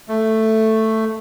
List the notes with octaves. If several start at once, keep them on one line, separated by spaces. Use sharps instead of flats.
A3